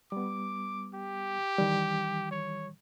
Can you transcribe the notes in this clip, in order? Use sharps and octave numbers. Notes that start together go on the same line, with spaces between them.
G3 B3 D6
G4
D#3 E3 G3
C#5